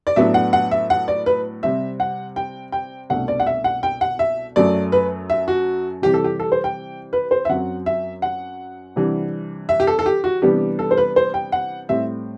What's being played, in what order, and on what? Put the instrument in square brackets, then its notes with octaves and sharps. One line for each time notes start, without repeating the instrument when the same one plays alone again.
[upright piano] D5
A2 F#3 B3 D4 E5
F#5
F#5
E5
F#5
D5
B4
C3 G3 C4 E5
F#5
G5
G5
C2 B2 A3 D4 F#5
D5
F#5
E5
F#5
G5
F#5
E5
F#2 F#3 A3 D5
B4
E5
F#4
C3 E3 G3 G4
A4
G4
A4
C5
G5
B4
C5
E5
F#2 F#3 C4 F#5
E5
F#5
C3 E3 G3 D4
E5
G4
A4
A4
G4
F#4
C3 E3 G3 B3 D4 G4
A4
C5
B4
C5
G5
F#5
A2 G3 C4 E5